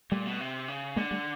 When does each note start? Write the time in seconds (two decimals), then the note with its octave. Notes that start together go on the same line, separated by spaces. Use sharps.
0.11 A#2 G3 A3
0.26 B2
0.40 C3
0.68 C#3
0.96 D3 G#3 A#3
1.11 G3 A3